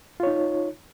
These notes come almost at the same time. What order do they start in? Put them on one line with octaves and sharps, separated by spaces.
F4 C#5 D#4